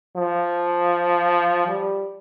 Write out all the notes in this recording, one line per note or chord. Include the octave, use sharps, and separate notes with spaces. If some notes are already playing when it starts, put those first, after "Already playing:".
F3
G3